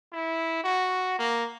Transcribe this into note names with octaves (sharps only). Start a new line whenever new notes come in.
E4
F#4
A#3